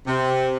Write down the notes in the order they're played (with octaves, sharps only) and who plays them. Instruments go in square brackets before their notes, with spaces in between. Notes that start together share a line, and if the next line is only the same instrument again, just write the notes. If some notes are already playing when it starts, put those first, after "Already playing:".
[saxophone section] C3